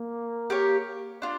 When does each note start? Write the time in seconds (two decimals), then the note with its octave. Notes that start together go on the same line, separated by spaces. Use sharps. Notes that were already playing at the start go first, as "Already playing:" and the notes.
Already playing: A#3
0.50 G4 A#4 C#5
1.22 D4 F4